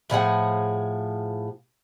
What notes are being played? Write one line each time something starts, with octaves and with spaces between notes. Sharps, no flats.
A2 F3 G#4 F#5